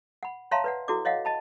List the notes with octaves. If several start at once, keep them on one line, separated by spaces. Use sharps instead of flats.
F#5 B5
C#5 E5 F5 A5 A#5 C6
B4 D5 F#5
E4 F#4 A4 D5 D6
C#5 D#5 F5 F#5
D#5 A5 B5